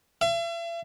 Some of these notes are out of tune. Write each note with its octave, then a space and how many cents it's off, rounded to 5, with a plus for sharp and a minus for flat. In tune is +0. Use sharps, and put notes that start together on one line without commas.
E5 +45